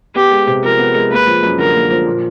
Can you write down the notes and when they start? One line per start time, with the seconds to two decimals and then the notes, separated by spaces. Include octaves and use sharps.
0.15 B3 G4
0.31 G#3
0.47 C3
0.63 F3 A#4
0.79 B3
0.95 G#3
1.11 A#3 B4
1.27 F3
1.43 F#2
1.58 D3 A#4
1.75 A#3
1.91 F3
2.06 A#2